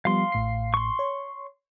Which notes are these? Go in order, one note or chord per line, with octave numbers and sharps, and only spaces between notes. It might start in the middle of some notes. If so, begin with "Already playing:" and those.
F3 G3 B3 F5 C6
A1 A2 C7
C6 C#6
C#5